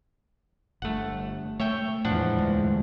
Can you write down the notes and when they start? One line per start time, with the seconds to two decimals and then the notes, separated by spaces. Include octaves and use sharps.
0.82 G1 G2 A3 F#5
1.60 A3 C#5 E5 G5
2.05 E2 A2 E3 F3 G#3 D4 F#5
2.38 D2 G2